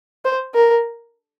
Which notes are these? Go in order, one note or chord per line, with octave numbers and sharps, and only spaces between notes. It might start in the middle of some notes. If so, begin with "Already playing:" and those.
C5
A#4